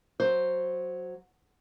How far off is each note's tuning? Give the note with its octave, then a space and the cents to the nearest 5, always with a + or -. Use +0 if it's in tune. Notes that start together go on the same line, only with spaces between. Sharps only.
F#3 +0 C5 +0